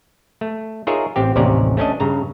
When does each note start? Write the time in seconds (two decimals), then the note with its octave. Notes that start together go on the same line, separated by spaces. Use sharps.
0.41 A3
0.87 D#4 F4 G#4 A#4 C#5 E5
1.16 A1 C4 G4
1.36 A1 D#2 C3 C#4 D5 A#5
1.77 A3 C#4 D4 D#5
2.00 G2 C#3 A#5